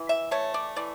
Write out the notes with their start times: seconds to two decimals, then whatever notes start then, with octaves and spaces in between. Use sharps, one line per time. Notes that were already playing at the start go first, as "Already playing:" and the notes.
Already playing: E3
0.09 E5
0.31 A3 C#5
0.54 D5
0.76 E3 D5